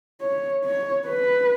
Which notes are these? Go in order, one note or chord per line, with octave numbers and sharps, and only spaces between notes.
C#5
C#5
B4